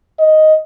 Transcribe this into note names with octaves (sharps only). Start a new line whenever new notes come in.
D#5